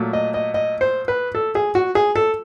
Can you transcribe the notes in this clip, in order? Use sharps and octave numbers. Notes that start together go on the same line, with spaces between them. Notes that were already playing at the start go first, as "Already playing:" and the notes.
Already playing: A#2 F#3 A3
D#5
D#5
D#5
C5
B4
A4
G#4
F#4
G#4
A4